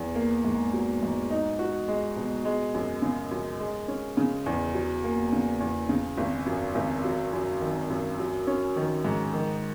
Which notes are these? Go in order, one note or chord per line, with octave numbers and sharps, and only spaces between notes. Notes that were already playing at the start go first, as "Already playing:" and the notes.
Already playing: E2
A#3
G#2
F#3
G#2
D#4
F#4
G#3
B2
G#3
F#2
C#3
F#2
G#3
C#4
C#3
E2
F#3
A#3
C#3
E2
C#3
G#1
F#2
G#1
F#3
F#2
D#3
F#2
F#3
C#4
D#3
G#2
D#3